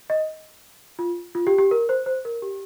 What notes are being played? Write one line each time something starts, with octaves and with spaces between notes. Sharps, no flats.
D#5
F4
F4
G4
G4
A#4
C5
C5
A#4
G4